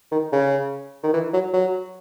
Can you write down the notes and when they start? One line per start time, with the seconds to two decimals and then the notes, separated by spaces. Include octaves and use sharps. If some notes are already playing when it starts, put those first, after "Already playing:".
0.12 D#3
0.33 C#3
1.03 D#3
1.13 E3
1.33 F#3
1.54 F#3